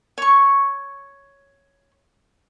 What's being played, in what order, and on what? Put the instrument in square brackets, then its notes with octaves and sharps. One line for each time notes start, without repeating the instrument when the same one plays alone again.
[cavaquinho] C#5 C#6